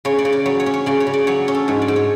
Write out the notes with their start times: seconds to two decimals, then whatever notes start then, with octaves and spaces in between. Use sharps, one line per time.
0.05 C#3 C#5
0.18 D5
0.25 C#3
0.32 D5
0.46 F#3 C#5
0.60 C#5
0.66 C#4
0.74 C#5
0.86 C#3 D5
1.00 C#5
1.07 C#3
1.14 D5
1.27 F#3 C#5
1.48 C#4
1.55 A4
1.68 G#2 C#5
1.82 D5
1.88 G#2
1.96 C#5